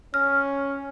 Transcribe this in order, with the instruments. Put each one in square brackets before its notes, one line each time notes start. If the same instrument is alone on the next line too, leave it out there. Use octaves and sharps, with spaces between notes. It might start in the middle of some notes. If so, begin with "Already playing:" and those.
[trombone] C#4 [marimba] F6